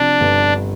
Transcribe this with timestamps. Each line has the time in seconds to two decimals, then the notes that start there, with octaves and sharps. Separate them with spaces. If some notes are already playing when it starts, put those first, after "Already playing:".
Already playing: C3 F3 D4
0.21 G1